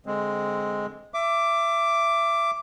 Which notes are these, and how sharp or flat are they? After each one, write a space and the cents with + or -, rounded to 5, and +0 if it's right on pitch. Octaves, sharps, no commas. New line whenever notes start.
D3 +0 G#3 +0 C4 +0
E5 +25 D6 +0